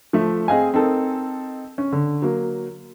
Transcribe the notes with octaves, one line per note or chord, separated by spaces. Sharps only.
F3 A3 E5
C4 G#4 D#5 F5 G#5
C4 D#4 A4 A#4
C#4
D3
F#3 A#3